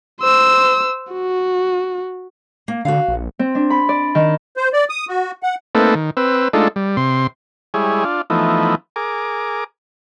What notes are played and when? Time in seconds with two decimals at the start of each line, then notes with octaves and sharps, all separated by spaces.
0.22 C5 E6
1.13 F#4
2.68 A#3
2.85 D3 F#4 F5
3.08 A#1
3.39 C4
3.55 D4
3.70 B5
3.89 D5
4.15 D#3
4.57 C5
4.73 D5
4.89 D#6
5.08 F#4
5.43 F#5
5.75 A3 A#3 C4 D#4 A4 B4
5.95 D#3
6.17 C4 B4 E6
6.53 G#3 A3 D4 D#4 F4 A4
6.76 G3
6.97 C3 C6
7.74 G3 G#3 E4 G#4 C#5
8.04 D4 F4
8.30 E3 F3 A3 B3 D#4
8.96 G#4 A#4 D6